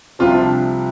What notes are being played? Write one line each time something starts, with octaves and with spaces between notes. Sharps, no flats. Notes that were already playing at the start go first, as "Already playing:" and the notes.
C2 C3 F3 F4
D4